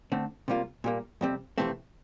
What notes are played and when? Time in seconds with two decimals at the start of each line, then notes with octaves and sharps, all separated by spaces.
0.12 D3 A3 C4
0.48 C3 G3 A#3 F4
0.84 A#2 G3 A#3
1.21 F2 C3 G3 C4
1.58 F2 C3 E3 A3 C4